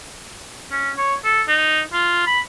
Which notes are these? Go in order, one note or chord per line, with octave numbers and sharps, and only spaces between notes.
C#4
C#5
A4
D#4
F4
B5